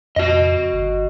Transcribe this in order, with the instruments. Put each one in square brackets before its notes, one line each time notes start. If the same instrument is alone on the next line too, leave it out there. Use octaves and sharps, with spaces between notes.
[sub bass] F2 [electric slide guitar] F#4 D#5
[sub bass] G1